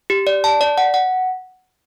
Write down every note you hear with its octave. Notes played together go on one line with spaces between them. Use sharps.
G4
D5
A5
D5
F#5
F#5